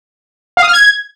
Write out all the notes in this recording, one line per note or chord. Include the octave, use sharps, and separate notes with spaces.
F5
D#6
F6
G#6